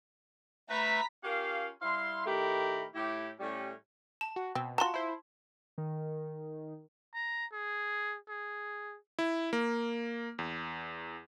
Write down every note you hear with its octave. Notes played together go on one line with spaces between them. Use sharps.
A3 B4 E5 A#5 B5 B6
C#4 F4 G4 A#4 F5
G3 E4 F5 C6
A2 D#3 A3 G4 A#4 B5
A2 E4 G4
A2 G3 C#4
A5
F#4
B2 C4
F4 F#4 A5 A#5 C6
E4 C5
D#3
A#5
G#4
G#4
E4
A#3
E2